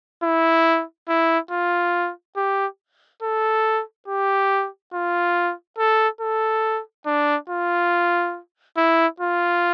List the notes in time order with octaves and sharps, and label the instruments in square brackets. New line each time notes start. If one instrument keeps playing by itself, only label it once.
[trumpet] E4
E4
F4
G4
A4
G4
F4
A4
A4
D4
F4
E4
F4